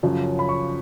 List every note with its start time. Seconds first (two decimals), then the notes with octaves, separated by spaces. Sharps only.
0.03 F#2 C#3 F3
0.39 B5
0.49 C#6